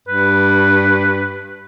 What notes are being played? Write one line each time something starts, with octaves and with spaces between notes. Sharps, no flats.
G2 B4